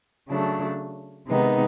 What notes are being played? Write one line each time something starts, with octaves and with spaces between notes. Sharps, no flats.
C#3 F#3 A3 D4
C3 D#3 G#3 B3 D#4